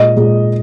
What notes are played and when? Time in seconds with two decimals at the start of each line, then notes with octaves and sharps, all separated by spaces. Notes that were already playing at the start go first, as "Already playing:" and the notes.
Already playing: A#2 G#3 D#5
0.16 A#2 G#3